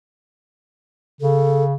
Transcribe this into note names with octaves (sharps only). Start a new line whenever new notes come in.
C#3 A4